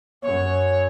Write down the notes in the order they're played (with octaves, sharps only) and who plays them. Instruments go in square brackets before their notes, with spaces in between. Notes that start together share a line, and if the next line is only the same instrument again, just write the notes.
[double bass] F#2 [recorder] C#5